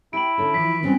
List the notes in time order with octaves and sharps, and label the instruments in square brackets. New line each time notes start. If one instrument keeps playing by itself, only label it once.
[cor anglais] E4 [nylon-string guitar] G4 G5 [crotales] D7 F#7
[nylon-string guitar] D3 C#4 A4
[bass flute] E3 [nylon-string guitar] F3 [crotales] B6
[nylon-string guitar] E3 G3 C4 [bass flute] C#4